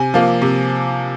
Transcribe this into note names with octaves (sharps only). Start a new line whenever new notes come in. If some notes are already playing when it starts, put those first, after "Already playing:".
Already playing: C3 G#5
F3 A#3
C3